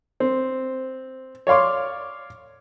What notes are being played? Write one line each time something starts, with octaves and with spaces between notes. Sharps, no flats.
C4
C#5 D5 F5 C6 D6